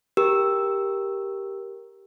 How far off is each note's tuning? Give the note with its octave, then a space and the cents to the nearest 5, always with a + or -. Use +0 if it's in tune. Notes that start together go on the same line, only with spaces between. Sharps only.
G4 +0 A#4 +5 E6 +0